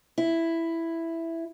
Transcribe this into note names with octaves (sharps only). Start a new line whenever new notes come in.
E4